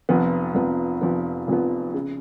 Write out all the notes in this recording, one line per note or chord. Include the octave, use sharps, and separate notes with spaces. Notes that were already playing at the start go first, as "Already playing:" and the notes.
F1 F2 F3 B3
F1 F2 F3 B3
F1 F2 F3 B3
F1 F2 F3 B3
C#3